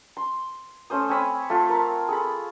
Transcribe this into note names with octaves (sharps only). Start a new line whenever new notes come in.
C6
A3 C#4 C5 D#6
C4 C#5 G#5 B5
A3 F4
A#4 A5
G#4 A4 B5